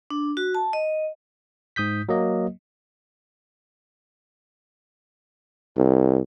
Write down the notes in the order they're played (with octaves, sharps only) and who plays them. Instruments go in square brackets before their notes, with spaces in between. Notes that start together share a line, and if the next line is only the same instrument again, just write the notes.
[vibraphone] D4
F#4
A5
D#5
[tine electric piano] G#2 D#6 G6 B6
F#3 A#3 D#5
[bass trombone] C2